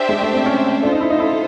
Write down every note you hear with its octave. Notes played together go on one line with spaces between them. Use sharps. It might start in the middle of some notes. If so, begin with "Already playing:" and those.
Already playing: D4 G4 C5 E5 G5
G#3
A3
C4
C#4
D4 F4 A4 C5
D#4
E4
D#4
E4